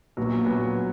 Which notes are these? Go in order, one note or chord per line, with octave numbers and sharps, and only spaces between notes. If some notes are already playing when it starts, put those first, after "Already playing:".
A#1 A#2 F#3 B3
A#2 F#3 B3